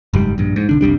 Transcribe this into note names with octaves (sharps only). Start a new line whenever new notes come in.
F#1 G#2 G3
A#1 G2
G#2
B1 D3 D4
F1 C2 G3 D4